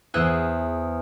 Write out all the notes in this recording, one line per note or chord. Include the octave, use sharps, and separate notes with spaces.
E2 G#4 C5 E6 F#6